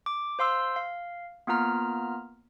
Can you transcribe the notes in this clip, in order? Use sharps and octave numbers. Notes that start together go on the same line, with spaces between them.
D6
C5 F5 C6 E6
F5
A#3 B3 F4 A#5 F6